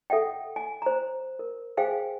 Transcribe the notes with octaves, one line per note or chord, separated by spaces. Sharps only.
A4 E5 F#5 G5
G#5
C5 A#5
A#4
G#4 C5 F5 G5 G#5